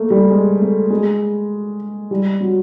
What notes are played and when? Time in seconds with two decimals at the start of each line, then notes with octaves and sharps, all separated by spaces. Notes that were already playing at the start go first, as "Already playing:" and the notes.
Already playing: A3 A#3
0.10 G3
0.31 G#3
0.61 A3
0.90 G#3
2.11 G3
2.40 F#3